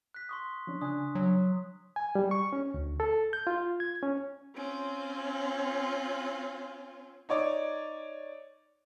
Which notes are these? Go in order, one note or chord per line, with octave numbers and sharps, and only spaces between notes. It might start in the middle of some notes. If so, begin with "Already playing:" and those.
F#6 B6
C6 C#6 D#6
F3 C#4 D4
C#3 D4 G#5 D#6 F#6
F#3
G#5
G3
C#6
C#4
D2
A4
G6
F4
G#6
C#4
C4 C#4 F4
D#4 C#5 D5 D6